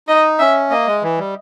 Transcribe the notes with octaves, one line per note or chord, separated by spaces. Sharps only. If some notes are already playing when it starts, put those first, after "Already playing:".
D#4 D#5
C#4 E5
A#3 D#5
G#3
E3
G3